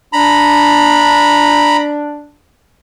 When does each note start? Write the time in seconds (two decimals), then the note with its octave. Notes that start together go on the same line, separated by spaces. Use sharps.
0.13 D4 A#5 B5